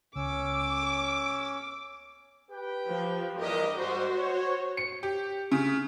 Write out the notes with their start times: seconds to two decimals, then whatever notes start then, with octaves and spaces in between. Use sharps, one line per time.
0.16 C#2 C#4 D6 E6
2.51 G4 B4 G5
2.87 F3
3.39 E2 G2 G4 A#4 D#5
3.78 G#2 G3 F#4 C5
4.17 C#5
4.77 C#7
5.03 G4
5.52 C#3